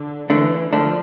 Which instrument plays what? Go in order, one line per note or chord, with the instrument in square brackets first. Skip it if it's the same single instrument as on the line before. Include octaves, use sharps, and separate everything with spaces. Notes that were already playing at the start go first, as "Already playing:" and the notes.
Already playing: [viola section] D3
[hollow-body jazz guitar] D3 A3 D4 [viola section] E3
[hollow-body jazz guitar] D3 A3 D4 [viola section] F3